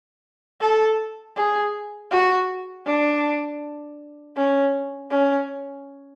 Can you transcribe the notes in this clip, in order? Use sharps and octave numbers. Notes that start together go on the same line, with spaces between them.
A4
G#4
F#4
D4
C#4
C#4